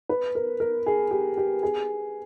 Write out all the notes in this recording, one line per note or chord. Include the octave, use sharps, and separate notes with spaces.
B4
A#4
A#4
G#4
G4
G4
G#4